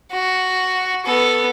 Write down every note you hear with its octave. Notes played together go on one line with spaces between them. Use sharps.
F#4
B3 A4